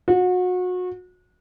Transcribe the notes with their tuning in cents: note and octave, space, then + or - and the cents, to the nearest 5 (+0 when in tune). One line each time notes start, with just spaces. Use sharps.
F#4 -30